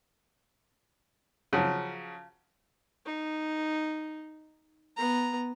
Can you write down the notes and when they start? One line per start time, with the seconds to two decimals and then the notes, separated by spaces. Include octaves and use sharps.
1.53 C#3 F3 F#3
3.06 D#4
4.97 B3 A#5